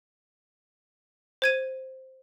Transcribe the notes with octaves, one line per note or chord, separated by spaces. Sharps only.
C5 G#6 D#7